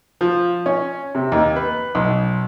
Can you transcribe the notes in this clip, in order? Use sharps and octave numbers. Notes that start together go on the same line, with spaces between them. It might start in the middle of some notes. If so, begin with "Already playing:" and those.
F3
C#4
C3
D#2
B4
B1